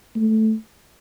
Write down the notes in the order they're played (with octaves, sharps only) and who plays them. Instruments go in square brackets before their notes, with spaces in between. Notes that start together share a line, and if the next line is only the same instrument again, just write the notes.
[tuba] A3